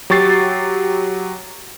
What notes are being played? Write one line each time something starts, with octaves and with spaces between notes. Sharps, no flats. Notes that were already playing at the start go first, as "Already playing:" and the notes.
F#3 G4 C#6 A6 C7